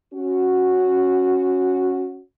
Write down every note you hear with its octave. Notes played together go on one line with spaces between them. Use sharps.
C#4 F#4